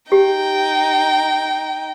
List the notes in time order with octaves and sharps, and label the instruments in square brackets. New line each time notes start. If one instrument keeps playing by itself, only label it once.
[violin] D#4 G5 [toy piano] G4